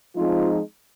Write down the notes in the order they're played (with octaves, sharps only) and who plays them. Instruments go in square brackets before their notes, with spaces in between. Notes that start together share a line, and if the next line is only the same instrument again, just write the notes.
[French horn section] F3 G#3 C4 D#4 F4